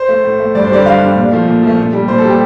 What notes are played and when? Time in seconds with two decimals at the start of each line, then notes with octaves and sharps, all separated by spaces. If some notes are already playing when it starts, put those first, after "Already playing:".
Already playing: C5
0.09 A3
0.25 A2
0.40 A3
0.55 G2 D5
0.64 C5
0.70 D3 G3 D5
0.86 G2 F5
1.01 D3 G3
1.16 A#2
1.32 F3 A3
1.47 A#2
1.63 F3 A3
1.78 A#2
1.93 G3
2.08 A#2 C5
2.18 A4
2.24 G3
2.29 G4